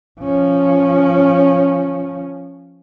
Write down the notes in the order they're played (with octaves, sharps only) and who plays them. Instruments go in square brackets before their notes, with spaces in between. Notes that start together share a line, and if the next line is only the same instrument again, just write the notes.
[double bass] F3 C#4